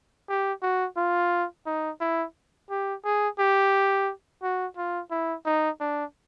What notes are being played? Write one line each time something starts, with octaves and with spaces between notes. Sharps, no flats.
G4
F#4
F4
D#4
E4
G4
G#4
G4
F#4
F4
E4
D#4
D4